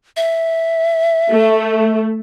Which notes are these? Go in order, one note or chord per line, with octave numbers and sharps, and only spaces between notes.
E5
A3